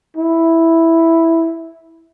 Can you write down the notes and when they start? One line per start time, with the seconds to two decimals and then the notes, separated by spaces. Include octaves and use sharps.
0.17 E4